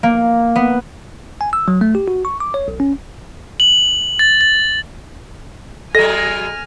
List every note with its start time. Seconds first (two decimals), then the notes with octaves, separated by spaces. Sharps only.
0.03 A#3
0.56 B3
1.41 G#5
1.53 E6
1.68 F#3
1.81 A3
1.95 G4
2.08 F#4
2.25 C#6
2.40 D6
2.54 C#5
2.68 B1
2.80 C#4
3.60 F#7
4.19 A6
4.41 A6
5.95 F#3 G#3 A4 D#5 G#5 F6 A#6